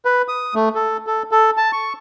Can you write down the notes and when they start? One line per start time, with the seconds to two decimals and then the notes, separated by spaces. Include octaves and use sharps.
0.05 B4
0.28 D#6
0.55 A3
0.75 A4
1.07 A4
1.31 A4
1.57 A5
1.72 C#6